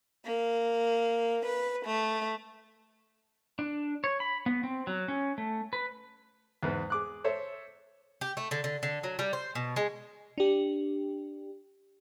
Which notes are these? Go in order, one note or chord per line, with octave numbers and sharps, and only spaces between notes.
A#3
B4
A3
D4
C#5
B5
B3
C4
F#3
C#4
A3
B4
E2 G#2 B4
G#4 D6 F#6
A4 C5 C#5 E5
G4
A3
D3
D3
D3
F#3
G3
C5
B2
G#3
D4 G4